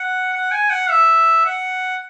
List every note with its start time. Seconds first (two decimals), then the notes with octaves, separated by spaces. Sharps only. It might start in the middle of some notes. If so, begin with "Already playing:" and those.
Already playing: F#5
0.33 F#5
0.51 G#5
0.70 F#5
0.90 E5
1.45 F#5